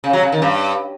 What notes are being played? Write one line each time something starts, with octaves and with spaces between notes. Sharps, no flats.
C#3
F#3
C#3
D#3
G2